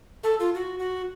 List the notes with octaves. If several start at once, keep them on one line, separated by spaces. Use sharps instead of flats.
A4
F4
F#4
F#4